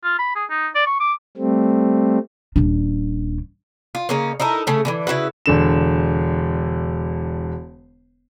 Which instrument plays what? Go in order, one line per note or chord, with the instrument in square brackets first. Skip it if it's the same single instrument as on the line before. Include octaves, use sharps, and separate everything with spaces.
[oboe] F4
B5
G#4
D#4
D5
C#6
D6
[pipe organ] G3 A3 C4
[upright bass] D#1 D4
[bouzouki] F4
C#3 A#3 C#4 D#4
D#4 E4 A4 A#4
C#3 A3 C#4
B2 D3 E3
C#3 E4 F#4 B4
[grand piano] E1 D3 E7